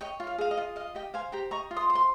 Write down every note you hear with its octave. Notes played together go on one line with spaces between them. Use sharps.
C#5 D#5 G5
F4
F5
G#4 F5
D#5
F4
D#5 F5
G4 D#5 G5
C5 F5 G#5
G4 G5 A#5
D#5 A#5 C#6
F4
C6 D#6
C5
C6